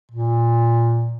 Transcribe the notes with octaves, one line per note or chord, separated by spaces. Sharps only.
A#2